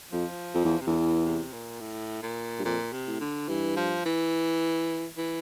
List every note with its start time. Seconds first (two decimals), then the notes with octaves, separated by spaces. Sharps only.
0.12 F2 F3
0.55 F2
0.65 E2
0.81 C3
0.87 E2 D3
0.96 E3
1.25 C3
1.53 A#2
1.80 A2
2.23 A#2
2.59 G2
2.65 F2 A#2
2.93 C3
3.07 A2
3.20 D3
3.49 G2 E3
3.77 F3
4.06 E3
5.17 E3